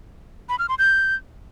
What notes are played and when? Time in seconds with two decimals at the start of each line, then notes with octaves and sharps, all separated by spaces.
0.49 B5
0.59 F6
0.69 C6
0.79 G6